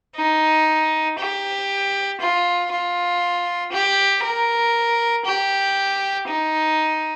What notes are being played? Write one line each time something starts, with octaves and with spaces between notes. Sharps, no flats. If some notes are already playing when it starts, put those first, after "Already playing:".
D#4
G4
F4
F4
G4
A#4
G4
D#4